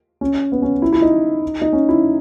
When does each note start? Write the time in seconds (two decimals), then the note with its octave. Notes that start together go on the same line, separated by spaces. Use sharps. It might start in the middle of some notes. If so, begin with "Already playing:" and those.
0.21 C#4
0.52 B3
0.62 C#4
0.82 E4
0.93 E4
1.02 D#4
1.62 D#4
1.73 C#4
1.89 E4